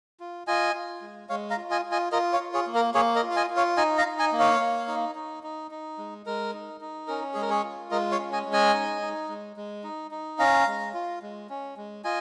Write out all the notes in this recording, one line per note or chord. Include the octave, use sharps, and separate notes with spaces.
F4
F4 D#5 G#5
F4
G#3
G#3 C#5 F5
F5 A#5
F4
D#5 G#5
F4
D#5 G#5
F4 A#4 D#5
C#5 F5
F4
G#4 C#5
A#3
A#4
A#3 G#4 C#5
A#4 D#5
F4
F5
D#5 G#5
F4
C#5 F5
D#4 D#5 G#5
F5 A#5
D#4
D#5 G#5
A#3
C#5 F5
A#3
D#4
D#4
D#4
D#4
G#3
G#3 A#4
D#4
D#4
C#4 A#4
G#3 G#4
A#4
G#4 C#5
F4
G#3 A#4 D#5
C#5 F5
C#4
D#5 G#5
G#3
D#5 G#5
D#4
D#4
G#3
G#3
D#4
D#4
C#4 F5 A#5
G#3
F4
G#3
C#4
G#3
F4 D#5 G#5